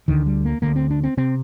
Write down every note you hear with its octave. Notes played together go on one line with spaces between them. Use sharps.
D2 D3 D#3
G3
A#3
D2 D3 A#3
C4
D4
C4
C3 C4